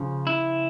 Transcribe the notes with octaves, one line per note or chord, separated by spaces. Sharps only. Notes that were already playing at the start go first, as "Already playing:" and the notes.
Already playing: C#3 F3
E4